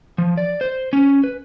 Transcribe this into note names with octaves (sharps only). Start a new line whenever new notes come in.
F3
D5
C5
C#4
B4